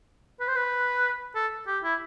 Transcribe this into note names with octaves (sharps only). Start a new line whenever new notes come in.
B4
C5
B4
A4
G4
E4